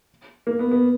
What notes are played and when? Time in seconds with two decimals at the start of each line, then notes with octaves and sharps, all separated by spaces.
0.47 A#3
0.59 B3
0.71 B3